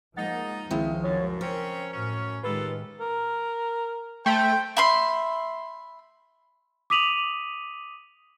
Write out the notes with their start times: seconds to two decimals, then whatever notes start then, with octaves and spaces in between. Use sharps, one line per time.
0.17 F3 G#3 A#3 D#4 F#5 A6
0.71 C#2 D#3 F3 G#3 C4 E4 E5 F5
1.04 F#2 C#5 A6
1.41 C4 C#4 A#4 C5
1.92 F#2 A2 C#4
2.43 A2 D#3 G#3 F4 G4 A4 B4
3.01 A#4
4.26 A3 C5 G5
4.77 E5 B5 C6
6.90 D6 D#6 B6 D#7 F7 F#7